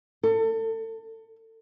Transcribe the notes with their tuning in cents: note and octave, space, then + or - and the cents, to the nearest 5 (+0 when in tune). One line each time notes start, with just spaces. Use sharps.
A4 +30